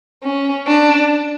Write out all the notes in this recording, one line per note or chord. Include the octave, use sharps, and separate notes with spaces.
C#4
D4